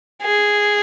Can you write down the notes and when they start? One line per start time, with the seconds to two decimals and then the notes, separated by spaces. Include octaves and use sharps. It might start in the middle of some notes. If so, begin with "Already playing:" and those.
0.23 G#4